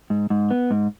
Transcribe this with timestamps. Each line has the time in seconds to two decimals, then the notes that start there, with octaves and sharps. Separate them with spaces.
0.10 G#2
0.30 G#2
0.51 B3
0.71 G#2